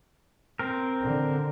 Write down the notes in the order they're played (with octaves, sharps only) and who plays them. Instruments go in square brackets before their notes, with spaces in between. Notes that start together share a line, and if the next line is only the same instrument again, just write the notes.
[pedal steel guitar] C4 A#4
[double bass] D3